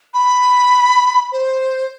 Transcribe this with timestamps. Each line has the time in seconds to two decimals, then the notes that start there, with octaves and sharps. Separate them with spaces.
0.14 B5
1.32 C5